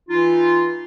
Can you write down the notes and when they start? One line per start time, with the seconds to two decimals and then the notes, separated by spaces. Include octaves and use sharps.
0.09 E3 D#4 F4